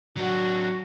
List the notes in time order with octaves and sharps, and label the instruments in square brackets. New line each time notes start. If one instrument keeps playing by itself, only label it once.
[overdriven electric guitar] F#3 D4 [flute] F#4